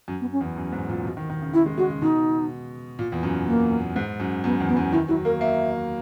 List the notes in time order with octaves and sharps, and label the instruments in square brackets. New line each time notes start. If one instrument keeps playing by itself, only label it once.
[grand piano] F#2
[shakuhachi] B3
C#4
[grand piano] E2
F#2
G#2
A#2
B2
D#3
D#3
C#3
[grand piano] D#3 [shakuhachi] E4
[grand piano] G#3
[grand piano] G#3 [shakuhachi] F#4
[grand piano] C#3
[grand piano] B2 [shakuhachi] D#4
[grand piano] A#2
E2
F#2
[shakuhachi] A#3
[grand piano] G#2
F#2
[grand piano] F#2 [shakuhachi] B3
[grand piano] E2
[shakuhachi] B3
[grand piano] F#2
[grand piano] D#3 [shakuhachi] E4
[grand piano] F#3 [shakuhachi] E4
[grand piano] A#3 [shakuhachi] A#4
[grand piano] A#3 [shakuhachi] E5